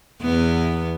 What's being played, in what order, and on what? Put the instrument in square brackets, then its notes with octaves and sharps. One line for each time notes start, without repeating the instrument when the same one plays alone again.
[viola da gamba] E2 B3